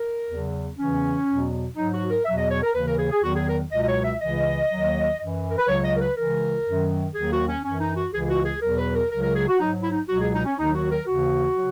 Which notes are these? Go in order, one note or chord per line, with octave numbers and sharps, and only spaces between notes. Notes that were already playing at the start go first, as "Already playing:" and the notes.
Already playing: A#4
E2 C#3 F#3
E2 C#3 E3 C#4
E2 B2 F#3
G#2 F#3 D#4
F#4
A#4
E2 B2 F#3 E5
D#5
C#5
A#4
D#2 C#3 E3 B4
A#4
G#4
G#4
E2 D#3 F#3 F#4
G#4
A#4
C#2 B2 F#3 D#5
D#5
C#5
E5
C#2 C#3 E3 D#5
D#2 D#3 F#3
F#2 E3
A#4
B4
C#2 C#3 F#3 C#5
D#5
A#4
B4
C#2 C#3 E3 A#4
F#2 D#3 F#3
D#2 D#3 F#3 G#4
F#4
C#4
F#2 E3 C#4
D#4
F#4
C#2 C#3 E3 G#4
G#4
F#4
G#4
E2 B2 F#3 A#4
B4
A#4
C#2 C#3 F#3 A#4
A#4
G#4
F#4
G#2 F#3 D#4
E4
D#4
C#2 B2 F#3 F#4
G#4
D#4
C#4
D#2 D#3 F#3 D#4
F#4
A#4
D#2 C#3 E3 F#4
C#3 F#3